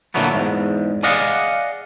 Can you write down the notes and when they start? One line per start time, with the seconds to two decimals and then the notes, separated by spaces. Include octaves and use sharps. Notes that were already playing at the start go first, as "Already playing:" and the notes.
0.14 A#2 D3 E3 F#3 A3 B3
0.34 E2 G#2
1.03 G#4 D5 D#5 F5 F#5